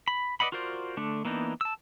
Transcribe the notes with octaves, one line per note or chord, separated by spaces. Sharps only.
B5
B4 D5 D#5 F#5 B5
F4 F#4 A#4 C5 D5
D3 A3 D4
E3 A#3 B3 D4 D#4
A5 E6